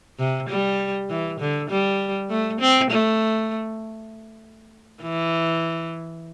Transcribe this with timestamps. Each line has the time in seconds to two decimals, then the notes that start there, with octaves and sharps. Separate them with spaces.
0.19 C3
0.49 G3
1.10 E3
1.40 D3
1.70 G3
2.30 A3
2.60 C4
2.90 A3
5.02 E3